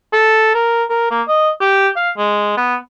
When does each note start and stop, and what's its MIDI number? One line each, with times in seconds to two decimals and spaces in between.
0.13 0.54 69
0.55 0.84 70
0.90 1.11 70
1.11 1.22 58
1.28 1.51 75
1.61 1.89 67
1.97 2.11 77
2.18 2.56 56
2.57 2.76 59